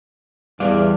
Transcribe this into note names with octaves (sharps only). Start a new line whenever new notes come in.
E2 G3 D5 F5